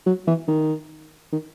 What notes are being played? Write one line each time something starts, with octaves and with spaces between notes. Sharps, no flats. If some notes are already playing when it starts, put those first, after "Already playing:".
F#3
E3
D#3
D#3